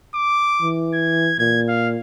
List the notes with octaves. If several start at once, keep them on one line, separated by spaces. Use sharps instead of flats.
D6
E3
G#6
A#2 G#6
F5